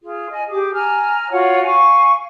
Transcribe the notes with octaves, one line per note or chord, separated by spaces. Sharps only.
F4 G#4
D#5 G#5
G4 G#4 D6
G#5 A#5 F6
F4 F#4 C#5 F#5
F5 G#5 C#6